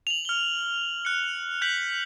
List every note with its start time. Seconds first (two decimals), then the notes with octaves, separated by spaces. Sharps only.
0.07 F7 F#7
0.25 F6 G7
1.05 F#6 C#7
1.62 F#6 G6 B6 F#7